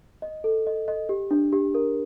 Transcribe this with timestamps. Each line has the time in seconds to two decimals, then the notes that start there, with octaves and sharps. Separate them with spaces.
0.22 D#5
0.44 A4
0.67 D#5
0.88 D#5
1.09 G4
1.31 D4
1.53 G4
1.75 A#4